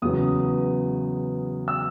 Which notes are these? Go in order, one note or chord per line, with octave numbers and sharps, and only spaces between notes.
E2 C#3 F#3 B3 D#6
E6